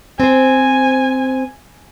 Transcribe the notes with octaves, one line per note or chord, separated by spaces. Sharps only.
C4 C5 G#5